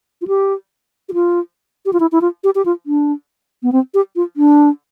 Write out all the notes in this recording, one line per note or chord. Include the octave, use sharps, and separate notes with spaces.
F4
G4
G4
F4
G4
F4
E4
E4
F4
G4
G4
F4
D4
B3
C4
G4
F4
D4